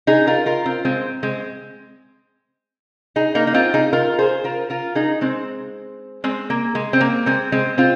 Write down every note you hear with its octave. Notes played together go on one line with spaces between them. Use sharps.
D#4 G#4
F4 A#4
F4 A#4
C4 F4
G#3 C4
G#3 C4
D#4 G#4
A#3 D#4
D#4
C4 F4
D#4 G#4
F4 A#4
G#4 C5
F4 A#4
F4 A#4
D#4 G#4
G#3 C4
G#3 C4
A#3
G#3
C4
A#3
G#3 C4
G#3 C4
C4 F4